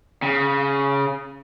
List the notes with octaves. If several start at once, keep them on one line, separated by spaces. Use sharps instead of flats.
C#3